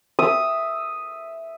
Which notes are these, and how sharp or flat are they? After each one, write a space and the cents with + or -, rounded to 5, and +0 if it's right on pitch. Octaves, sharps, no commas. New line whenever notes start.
E5 +0 D#6 +0